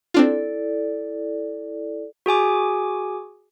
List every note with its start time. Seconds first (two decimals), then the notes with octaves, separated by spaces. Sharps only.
0.14 C4 D4 E4 F4 A4 D5
2.26 F#4 G#4 G#5 D6